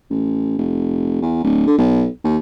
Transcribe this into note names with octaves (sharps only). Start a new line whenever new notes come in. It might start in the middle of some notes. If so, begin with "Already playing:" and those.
A1
F1
E2
D1
D3
B1
D#2